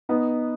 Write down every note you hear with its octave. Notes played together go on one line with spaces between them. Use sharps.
B3 D#4